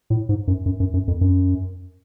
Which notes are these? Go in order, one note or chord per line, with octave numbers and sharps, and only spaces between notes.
A2
G#2
F#2
F#2
F#2
F#2
F2
F#2